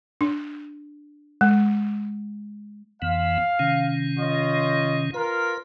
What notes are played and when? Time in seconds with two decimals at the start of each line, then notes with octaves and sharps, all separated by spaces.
0.21 D4
1.41 G#3
3.02 F2 E3 B3 F5
3.59 C3 D#3 C#4
4.17 F4 C#5 D#5
5.14 F4 A#4 B4